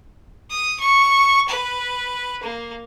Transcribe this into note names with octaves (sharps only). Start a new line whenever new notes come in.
D#6
C#6
B4
A#3